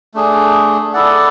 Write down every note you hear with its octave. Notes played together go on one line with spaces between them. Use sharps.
A3 D4 G#4
E4 A4 D5 F#5